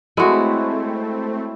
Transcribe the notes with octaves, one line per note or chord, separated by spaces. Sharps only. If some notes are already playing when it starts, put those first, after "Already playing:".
G#3 A3 C4 E4 F#4 B4 C#5